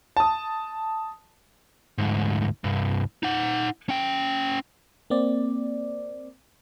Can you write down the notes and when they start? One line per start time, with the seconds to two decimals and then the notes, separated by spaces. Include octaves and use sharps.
0.17 A5 D#6
1.98 D2 G#2
2.64 C2 G2
3.23 D#4 F#5
3.89 C#4 G5
5.10 A#3 C4 D5